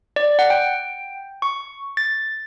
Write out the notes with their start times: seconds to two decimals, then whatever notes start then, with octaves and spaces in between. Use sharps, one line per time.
0.16 D5
0.39 F#5
0.50 G5
1.42 C#6
1.97 A6